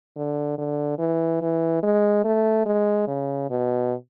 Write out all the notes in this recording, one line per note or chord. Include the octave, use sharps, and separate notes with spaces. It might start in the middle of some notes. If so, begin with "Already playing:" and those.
D3
D3
E3
E3
G#3
A3
G#3
C#3
B2